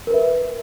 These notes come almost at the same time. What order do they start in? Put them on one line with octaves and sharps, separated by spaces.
A#4 B4 E5